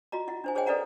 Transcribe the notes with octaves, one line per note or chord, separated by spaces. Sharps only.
F4 F#4 D#5 A#5
E4 F4 E5 F#5
D4 C5 G#5
G#4 C5 C#5 D#5 G5 G#5
A4 B4 D5 E5 F#5 A#5